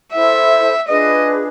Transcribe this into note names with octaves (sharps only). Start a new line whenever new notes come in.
E4 A4 C5 E5
D4 F4 G#4 B4 D#5